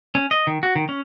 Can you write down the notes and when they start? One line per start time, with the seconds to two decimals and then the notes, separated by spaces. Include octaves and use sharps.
0.15 C#4
0.31 D#5
0.47 D#3
0.63 F#4
0.76 D#3
0.89 C#4